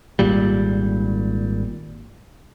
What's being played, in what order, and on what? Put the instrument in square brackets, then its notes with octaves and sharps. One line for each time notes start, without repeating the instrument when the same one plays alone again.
[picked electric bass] G#1 A#2 G3